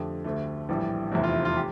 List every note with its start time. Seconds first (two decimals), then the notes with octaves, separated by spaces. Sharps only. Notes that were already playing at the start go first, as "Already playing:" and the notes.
Already playing: F2 D3 A3 G4
0.24 D2 D3 A3
0.69 A#1 A2 E3 G3
1.12 F1 E2 C3 E4
1.24 F4
1.45 F4
1.57 G4